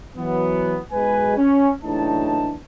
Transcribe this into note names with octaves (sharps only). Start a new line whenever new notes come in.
E3 F#3 B3
B1 G#3 B4 G#5
C#4
F#1 A2 E3 D4 D#4 A5